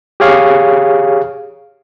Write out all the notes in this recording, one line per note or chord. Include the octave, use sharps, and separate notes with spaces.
G4 G#4 C#5 F5